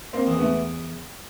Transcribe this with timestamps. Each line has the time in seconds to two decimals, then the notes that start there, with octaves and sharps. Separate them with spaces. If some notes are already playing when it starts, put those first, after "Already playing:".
0.13 A#3 C4
0.26 E2
0.38 A3 B3